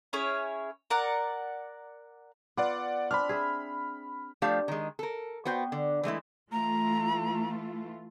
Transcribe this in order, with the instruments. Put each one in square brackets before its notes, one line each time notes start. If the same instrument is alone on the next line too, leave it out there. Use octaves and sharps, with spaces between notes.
[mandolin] C#4 E4 G#4 C#5
A#4 D5 F#5
[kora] B3 F4 B4 [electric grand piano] D5 F#5 D6
[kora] C4 D4 [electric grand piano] B5 F6
[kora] G#4 E5
[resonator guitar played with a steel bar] F3 A3 D4 G4 F5
D#3 G#3
A4 A#4
B3 F#4 C5 G5
D3
E3 G#3 A3 E4
[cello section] E3 A3 F4 [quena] A#5